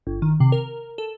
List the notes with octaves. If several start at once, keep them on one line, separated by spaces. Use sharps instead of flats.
G1
D#3
C3
A#4
A4